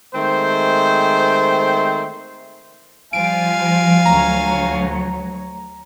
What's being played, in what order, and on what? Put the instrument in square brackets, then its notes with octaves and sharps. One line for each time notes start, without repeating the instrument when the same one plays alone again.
[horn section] D#3 G#3 A3 C4 C5
[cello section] F3 G3 [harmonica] F4 F5 G#5 [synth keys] D7
[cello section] D2 F#3 C#5 [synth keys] A#5